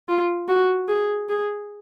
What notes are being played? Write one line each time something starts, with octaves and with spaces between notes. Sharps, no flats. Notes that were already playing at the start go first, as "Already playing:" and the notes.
F4
F#4
G#4
G#4